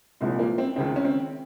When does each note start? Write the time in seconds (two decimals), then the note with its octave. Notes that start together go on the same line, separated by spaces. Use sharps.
0.21 C2 A#2 F3 G#3
0.39 A#3
0.58 C4
0.76 C#2 C3 D#3 C4
0.96 C#4
1.05 C4